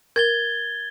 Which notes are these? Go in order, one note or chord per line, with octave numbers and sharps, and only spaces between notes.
A#4 G#6 A6 G7